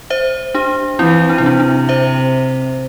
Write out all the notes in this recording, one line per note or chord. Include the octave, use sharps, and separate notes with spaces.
C5 E5
D4 G4
E3 C4 E4
D4
E4
C3 D4
D4
C5 E5